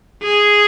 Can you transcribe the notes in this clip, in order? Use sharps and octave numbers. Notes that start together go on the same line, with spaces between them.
G#4